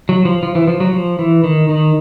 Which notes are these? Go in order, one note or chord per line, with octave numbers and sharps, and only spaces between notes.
F#3
F3
F3
E3
F3
F#3
F3
E3
D#3
D#3